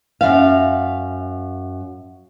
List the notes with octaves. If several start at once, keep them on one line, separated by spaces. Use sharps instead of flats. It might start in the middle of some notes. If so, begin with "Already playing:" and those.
F#2 G#3 E5 F5